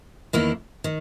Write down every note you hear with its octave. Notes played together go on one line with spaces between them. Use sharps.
E2 D#3 A#3 E4
D#3